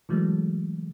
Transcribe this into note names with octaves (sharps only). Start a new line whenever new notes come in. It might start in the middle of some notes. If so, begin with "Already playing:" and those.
C#3 E3 F#3 G#3 A3